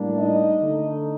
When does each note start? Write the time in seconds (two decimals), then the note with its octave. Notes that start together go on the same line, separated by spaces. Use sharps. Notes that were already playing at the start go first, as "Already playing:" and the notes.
Already playing: A2 G3 A#3 D4
0.19 D#4 D#5
0.60 D3 A3 D#4